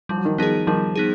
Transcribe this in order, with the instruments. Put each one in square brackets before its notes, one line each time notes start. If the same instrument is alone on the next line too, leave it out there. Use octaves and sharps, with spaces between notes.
[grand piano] F3 [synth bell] G3
[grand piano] F#3
D#3 F3
[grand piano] D#3 F3 [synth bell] B3 D#4 G#4
[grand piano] D#3 F3 [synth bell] G3
[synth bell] B3 D#4 G#4